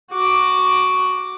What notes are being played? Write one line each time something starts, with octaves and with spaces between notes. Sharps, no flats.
F#4 D6